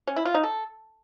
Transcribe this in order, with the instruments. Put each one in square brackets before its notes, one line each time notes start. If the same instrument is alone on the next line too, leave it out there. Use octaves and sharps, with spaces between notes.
[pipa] C#4
E4
F4
D#4
A4